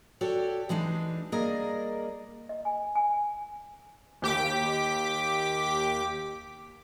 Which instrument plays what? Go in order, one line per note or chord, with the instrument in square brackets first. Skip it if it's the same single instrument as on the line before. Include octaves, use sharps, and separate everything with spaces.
[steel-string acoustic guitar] F#4 G4 A4 C#5 D5
E3 G#3 D4 D#4
G3 A#3 G#4 A#4 D5 D#5
[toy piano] D#5
G#5
G#5
[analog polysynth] D#2 G4 D6 B6